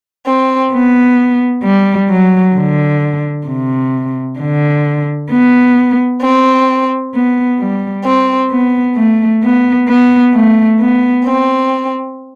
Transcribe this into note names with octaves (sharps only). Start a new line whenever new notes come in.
C4
B3
G3
F#3
D3
C3
D3
B3
C4
B3
G3
C4
B3
A3
B3
B3
A3
B3
C4